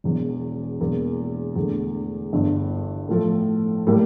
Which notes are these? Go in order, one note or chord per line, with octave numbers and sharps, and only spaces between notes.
E1 E2 E3
E1 E2 E3 A#3
E2 D3 A3
G1 G2 E3
A2 F3 A3
A2 G3 A#3